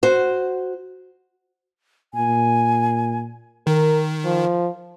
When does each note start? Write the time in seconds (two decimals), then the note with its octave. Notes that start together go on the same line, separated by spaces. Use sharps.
0.03 F#4 C5
2.14 A#2 G#5
3.67 D#3 A#4
4.25 F3